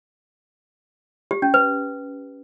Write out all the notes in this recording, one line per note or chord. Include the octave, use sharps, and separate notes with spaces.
G4
C#4
B4